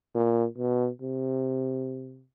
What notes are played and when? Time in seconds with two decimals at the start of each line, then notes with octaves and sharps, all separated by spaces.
0.15 A#2
0.58 B2
1.02 C3